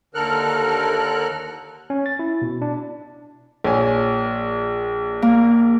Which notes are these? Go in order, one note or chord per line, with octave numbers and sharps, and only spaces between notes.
D#2 D3 A4 A#4 F6 F#6
C#4
A6
E4
B2
D4
A#1 C#5 G#5
A#3